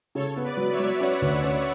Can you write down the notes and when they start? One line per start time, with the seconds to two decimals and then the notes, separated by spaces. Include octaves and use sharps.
0.15 C#3 A4 C#5
0.36 B3
0.44 B4 D5
0.57 F#3
0.72 C#5 E5
0.79 F#3
1.00 C#4 D5 F#5
1.22 D2
1.44 C#4